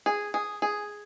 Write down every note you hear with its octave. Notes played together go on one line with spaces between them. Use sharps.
G#4
G#4
G#4